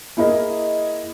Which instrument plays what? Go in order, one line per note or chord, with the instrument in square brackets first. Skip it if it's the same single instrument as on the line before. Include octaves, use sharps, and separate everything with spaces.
[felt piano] A#3 E4 G#4 A#4 D#5